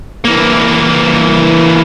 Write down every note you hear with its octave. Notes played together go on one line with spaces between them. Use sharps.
E3 A#3